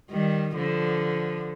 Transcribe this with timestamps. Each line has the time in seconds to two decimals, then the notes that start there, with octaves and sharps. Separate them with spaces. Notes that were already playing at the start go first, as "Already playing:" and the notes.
0.11 D#3 G3
0.57 D3 F3